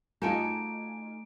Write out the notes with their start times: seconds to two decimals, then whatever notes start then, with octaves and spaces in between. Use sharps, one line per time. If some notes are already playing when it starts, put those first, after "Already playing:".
0.22 A3 D#4 F4 F#4 A4 G#5 D7